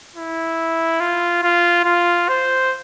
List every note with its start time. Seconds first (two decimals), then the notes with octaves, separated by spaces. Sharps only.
0.15 E4
1.00 F4
1.43 F4
1.85 F4
2.29 C5